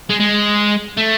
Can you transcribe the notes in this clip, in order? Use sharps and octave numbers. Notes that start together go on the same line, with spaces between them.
G#3
G#3
A3